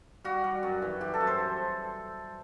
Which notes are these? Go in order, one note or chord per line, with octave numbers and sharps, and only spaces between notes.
G3 F#4
G3
F#2
E3
E3 G4
A4
F#2
C5